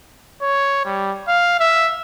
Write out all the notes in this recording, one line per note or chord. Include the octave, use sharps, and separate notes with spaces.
C#5
G3
F5
E5